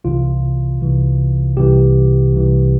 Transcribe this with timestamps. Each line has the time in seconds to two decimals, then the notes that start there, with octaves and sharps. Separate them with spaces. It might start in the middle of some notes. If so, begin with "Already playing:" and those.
0.04 C2 C3 E3 F4
0.80 C2 C3 E3
1.57 C2 C3 E3 G4
2.32 C2 C3 E3